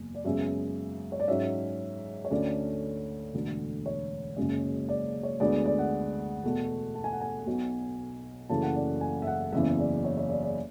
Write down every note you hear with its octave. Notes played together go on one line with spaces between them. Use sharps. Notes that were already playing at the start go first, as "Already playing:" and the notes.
Already playing: F#1 E2
D5
F#2 C#3 G#3 B3 E5
C#5
D5
G#2 F#3 C#4 E5
C#5
D2 D3 A3 C#4 D5
E1 D2 D3
C#5
F#1 F#2 C#3 G#3 C#4
D5
C#5
D2 D3 G#3 B3 D5
D5
F#5
E2 B2 A3
A5
G#5
F#5
G#5
B1 B2 F#3 B3
F#1 F#2 C#3 E3 A3 A5
F#5
D5
G#5
E5
F#5
F#1 E2 C#3 E3 E5
D5
C#5
C#5
D5
D5